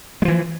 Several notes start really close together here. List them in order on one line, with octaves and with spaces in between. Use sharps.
G#3 F3 E3